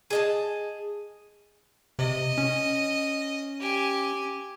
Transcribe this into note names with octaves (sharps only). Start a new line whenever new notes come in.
G#4 D#5 A5
C3 D#5
C#4
G4 G#5